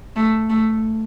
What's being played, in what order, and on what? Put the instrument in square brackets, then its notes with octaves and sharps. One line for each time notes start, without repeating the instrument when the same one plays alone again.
[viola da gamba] A3
A3